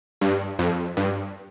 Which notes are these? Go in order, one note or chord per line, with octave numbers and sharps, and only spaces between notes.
G2
F2
G2